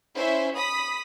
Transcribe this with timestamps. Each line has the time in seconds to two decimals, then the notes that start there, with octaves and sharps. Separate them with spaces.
0.16 C#4 E4 C5 E5
0.56 B5 D#6 B6